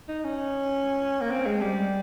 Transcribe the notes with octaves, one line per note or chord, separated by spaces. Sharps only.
D#4
C#4
A#3
C4
G#3
G3